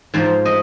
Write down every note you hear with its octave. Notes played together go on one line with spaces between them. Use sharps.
G#2 F3 C5
D#5